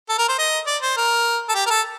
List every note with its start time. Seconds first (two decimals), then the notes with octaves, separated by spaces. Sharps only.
0.09 A4
0.18 A#4
0.28 C5
0.38 D#5
0.67 D5
0.82 C5
0.97 A#4
1.49 A4
1.55 G4
1.66 A#4
1.70 A4